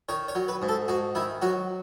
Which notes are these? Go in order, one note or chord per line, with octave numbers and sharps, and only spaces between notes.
D#3 C#5
C#5
F#3
B4
G#2
A4
G#2 F#4
D#3 E4
F#3 F#4